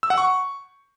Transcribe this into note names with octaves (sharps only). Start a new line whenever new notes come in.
E6
F#5
C#6